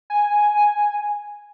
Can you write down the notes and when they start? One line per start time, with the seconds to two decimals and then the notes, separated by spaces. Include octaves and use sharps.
0.10 G#5